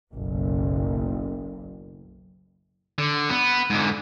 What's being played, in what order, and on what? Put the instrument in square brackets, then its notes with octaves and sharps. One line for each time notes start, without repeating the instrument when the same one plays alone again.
[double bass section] F#1 B1
[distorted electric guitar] D3
B3
G#2 D3